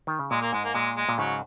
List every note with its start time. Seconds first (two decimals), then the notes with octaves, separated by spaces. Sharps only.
0.07 D#3
0.19 C#3
0.31 A#2 G#3
0.41 A#3
0.53 G#2 G#3
0.64 A#3
0.74 A#2 G#3
0.97 G#3
1.09 A#2
1.18 G#2 C#3 F#3